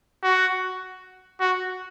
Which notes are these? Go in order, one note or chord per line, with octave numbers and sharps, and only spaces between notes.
F#4
F#4